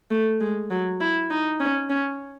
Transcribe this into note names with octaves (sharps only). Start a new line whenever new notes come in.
A3
G#3
F#3
E4
D#4
C#4
C#4